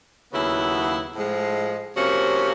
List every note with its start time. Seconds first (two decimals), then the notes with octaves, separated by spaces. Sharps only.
0.32 D#2 C#3 F#3 B3 E4
1.14 A2 F3 G#3
1.95 C3 F3 A#3 C#4 F#4